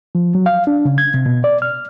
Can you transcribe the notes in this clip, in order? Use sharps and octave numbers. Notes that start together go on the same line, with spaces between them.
F3
F#3
F5
D4
C#3
G#6
C3
B2
D5
F6